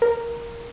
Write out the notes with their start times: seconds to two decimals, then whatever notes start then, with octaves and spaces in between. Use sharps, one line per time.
0.02 A#4